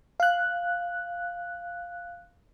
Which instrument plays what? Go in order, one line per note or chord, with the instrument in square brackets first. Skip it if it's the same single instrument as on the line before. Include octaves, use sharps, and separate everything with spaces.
[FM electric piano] F5 F#6